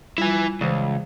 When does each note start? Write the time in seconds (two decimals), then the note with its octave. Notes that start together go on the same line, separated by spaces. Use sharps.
0.18 G3 E4 F4 G#5
0.61 C#2 E3 C5